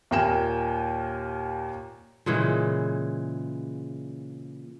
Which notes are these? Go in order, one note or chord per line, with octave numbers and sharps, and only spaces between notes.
D#2 A#2 A#4 G5 G#5 E7
A#2 C#3 E3 G#3